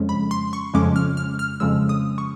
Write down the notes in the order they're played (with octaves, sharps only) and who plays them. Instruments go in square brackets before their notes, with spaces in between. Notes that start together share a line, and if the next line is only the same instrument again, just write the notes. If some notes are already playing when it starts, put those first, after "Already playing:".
Already playing: [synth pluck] F2 C#3 F3 G#3 C#4
B5
C6
C#6
F2 C#3 F3 G#3 C#4 D6
F6
F6
F6
F2 C#3 F3 G#3 C#4 E6
D#6
C#6